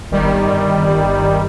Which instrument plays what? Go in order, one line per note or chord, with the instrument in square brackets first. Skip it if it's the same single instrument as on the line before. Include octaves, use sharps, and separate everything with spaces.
[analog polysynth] G1 D#3 G3